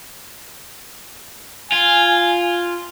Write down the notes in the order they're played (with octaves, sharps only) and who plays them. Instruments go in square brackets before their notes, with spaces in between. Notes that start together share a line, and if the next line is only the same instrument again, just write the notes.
[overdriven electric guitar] F4 [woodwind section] G#5